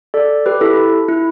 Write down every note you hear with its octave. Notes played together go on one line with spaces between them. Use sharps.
A4 D5
G4 B4
E4 A4
E4